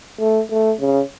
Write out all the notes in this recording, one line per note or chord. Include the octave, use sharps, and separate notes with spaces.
A3
A3
C#3